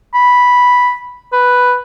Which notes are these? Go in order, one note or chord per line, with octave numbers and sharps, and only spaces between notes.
B5
B4